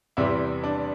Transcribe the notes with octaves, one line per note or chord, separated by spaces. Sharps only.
E2 C3 E3 G3 E4
D4